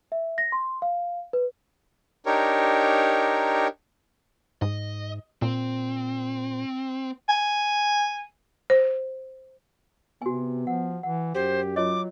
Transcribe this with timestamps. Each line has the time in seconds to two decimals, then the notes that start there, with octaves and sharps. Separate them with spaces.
0.12 E5
0.38 A#6
0.52 C6
0.82 F5
1.33 B4
2.26 D4 D#4 G4 A#4 C#5
4.62 G#2 D#5
5.42 A#2 C4
7.29 G#5
8.70 C5
10.22 C3 B3 F#4 G#5
10.67 F3 F#5
11.03 E3 F#5
11.35 F#2 G4 C5
11.76 F#3 F4 C#5 D#5 D6